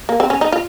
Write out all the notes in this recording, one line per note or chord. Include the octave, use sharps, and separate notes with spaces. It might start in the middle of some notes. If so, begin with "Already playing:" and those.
A#3
C4
C#4
D#4
F4